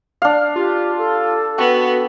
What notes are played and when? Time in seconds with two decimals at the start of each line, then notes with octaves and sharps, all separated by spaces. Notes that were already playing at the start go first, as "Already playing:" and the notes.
0.22 D4 F5
0.56 F4 G4
0.98 A4
1.58 B3 F#4 G5